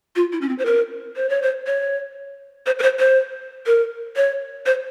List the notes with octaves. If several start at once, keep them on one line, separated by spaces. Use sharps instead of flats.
F4
E4
C#4
C4
C5
A#4
C5
C#5
C5
C#5
C5
A#4
C5
C5
A#4
C#5
C5